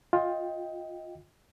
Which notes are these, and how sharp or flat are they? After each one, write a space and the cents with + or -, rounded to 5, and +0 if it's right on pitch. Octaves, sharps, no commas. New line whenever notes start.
F4 +15 D#5 +20 G5 +0